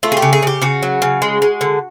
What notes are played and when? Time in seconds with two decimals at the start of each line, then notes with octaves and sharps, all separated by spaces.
0.03 A3 F4
0.12 G#4
0.17 G4
0.22 C#3
0.33 G#4
0.43 C#3 G4
0.62 C#3 F#4
0.82 F#3
1.02 C#3
1.22 G#3
1.42 G#3
1.61 D3